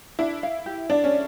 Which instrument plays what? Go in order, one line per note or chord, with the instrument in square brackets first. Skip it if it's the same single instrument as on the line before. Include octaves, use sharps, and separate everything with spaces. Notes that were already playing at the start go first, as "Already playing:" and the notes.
[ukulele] D4 [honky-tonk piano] E4
[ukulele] F5
G4
[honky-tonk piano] D4 [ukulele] D5
[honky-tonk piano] C#4